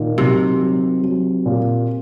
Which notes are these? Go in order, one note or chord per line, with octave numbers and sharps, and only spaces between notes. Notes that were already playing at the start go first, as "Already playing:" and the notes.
Already playing: A#2 D#3
C3 F#3
F#3
F#3
A#2